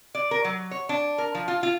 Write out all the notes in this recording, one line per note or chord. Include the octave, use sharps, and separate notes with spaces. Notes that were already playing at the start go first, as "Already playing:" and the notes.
D5
A#4
F#3
C#5
D4
A#4
F3
F4
F4